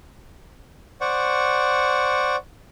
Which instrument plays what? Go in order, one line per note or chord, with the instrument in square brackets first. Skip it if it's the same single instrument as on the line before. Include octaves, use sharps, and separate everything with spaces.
[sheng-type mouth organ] C5 D5 F#5 C#6